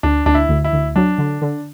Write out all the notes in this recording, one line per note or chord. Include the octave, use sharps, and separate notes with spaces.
D2 D4
D2 D4
E4
D2
E4
D2
F#3 D4
D3
D3